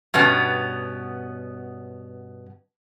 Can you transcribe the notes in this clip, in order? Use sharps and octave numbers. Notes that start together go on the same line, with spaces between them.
G2 B2 B3 C#4